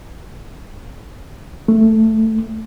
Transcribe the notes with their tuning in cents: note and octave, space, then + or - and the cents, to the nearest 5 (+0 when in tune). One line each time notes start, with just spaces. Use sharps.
A3 +5